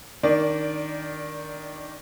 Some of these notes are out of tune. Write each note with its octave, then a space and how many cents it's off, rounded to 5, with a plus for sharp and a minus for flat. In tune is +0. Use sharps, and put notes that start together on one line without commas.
D#3 +0 D4 -20 D5 +0